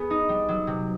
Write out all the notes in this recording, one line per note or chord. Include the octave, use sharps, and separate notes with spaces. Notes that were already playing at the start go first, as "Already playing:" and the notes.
Already playing: B3 G#4
D#4
G3
F#3
C3